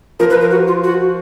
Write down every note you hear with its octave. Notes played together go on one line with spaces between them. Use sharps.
F3 A#4
B4
A#4
F#4
F4
F#4